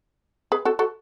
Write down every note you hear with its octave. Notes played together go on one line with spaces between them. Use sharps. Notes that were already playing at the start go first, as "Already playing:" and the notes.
G#4 B4
F#4 A4
F#4 A4